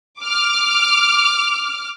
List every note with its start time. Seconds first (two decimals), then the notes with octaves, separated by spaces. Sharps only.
0.20 D6 F6